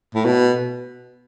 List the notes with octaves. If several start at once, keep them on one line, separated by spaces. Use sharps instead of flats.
A2
B2